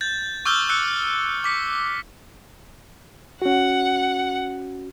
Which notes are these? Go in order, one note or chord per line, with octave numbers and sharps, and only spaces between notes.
G6 A6
C#6 D6 E6 F6 G6 G7
E6 F#6 C#7
D6 B6 C#7
C#4 F#4 F#5